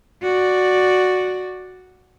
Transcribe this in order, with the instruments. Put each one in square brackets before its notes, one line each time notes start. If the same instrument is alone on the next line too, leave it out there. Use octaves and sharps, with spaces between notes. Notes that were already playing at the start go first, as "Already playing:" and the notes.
[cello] F#4 D5